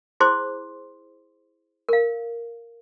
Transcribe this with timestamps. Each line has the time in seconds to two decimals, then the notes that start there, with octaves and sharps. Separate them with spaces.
0.20 E4 G#4 C5 C6 D6
1.89 A#4 F5